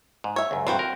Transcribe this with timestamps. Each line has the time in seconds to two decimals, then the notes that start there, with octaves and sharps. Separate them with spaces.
0.24 G#2
0.36 C#5 E5
0.51 C#2 F#2
0.67 D2 G2 C4 F#4 C5
0.79 A#4